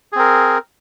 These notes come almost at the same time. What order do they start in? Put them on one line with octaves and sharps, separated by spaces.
G#4 C4 A#4